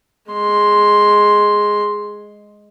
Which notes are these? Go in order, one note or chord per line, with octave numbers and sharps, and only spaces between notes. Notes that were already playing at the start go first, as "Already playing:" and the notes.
G#3 C6